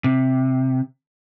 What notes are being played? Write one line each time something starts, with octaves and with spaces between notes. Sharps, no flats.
C3